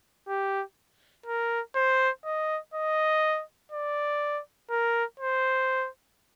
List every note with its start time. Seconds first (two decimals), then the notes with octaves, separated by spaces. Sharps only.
0.28 G4
1.26 A#4
1.76 C5
2.25 D#5
2.74 D#5
3.72 D5
4.70 A#4
5.20 C5